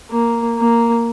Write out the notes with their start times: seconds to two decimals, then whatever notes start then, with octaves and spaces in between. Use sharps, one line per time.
0.11 A#3
0.59 A#3